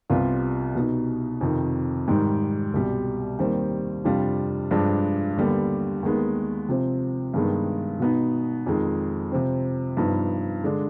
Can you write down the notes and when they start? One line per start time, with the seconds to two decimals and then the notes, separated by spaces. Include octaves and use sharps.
0.10 C2 C3 G3 B3 F4
0.75 B2 B3 D#4
1.41 F2 C3 D#3
2.08 G#2 D#3 G3
2.74 C2 B2 G3
3.39 D#2 D#3 G3 C4
4.04 F2 C3 G3 D4 F4
4.71 G2 F3 G#3 D4
5.36 D#2 D3 G3 B3
6.02 D#2 D#3 G#3 B3
6.69 C3 F3 C4
7.34 G2 D#3 G#3 B3
7.99 B2 B3 D#4
8.66 F2 D#3 G#3
9.32 C3 F3 C4
9.97 G2 F3 B3 D#4
10.63 D3 G#3 D4